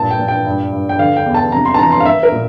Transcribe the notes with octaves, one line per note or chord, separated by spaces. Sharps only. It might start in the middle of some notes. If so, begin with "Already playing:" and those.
Already playing: G2 A#2 A5
G5
A#2
G5
G2
G2
G5
D3 F5
G5
E2
A5
C3 A#5
C6
A5
E3 A#5
C6
F5
A#3 E5
A#4
A#2